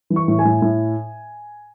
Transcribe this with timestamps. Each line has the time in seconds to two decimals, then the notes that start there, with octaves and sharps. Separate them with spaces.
0.10 E3
0.16 C#6
0.28 A2
0.39 G#5
0.45 A2
0.62 A2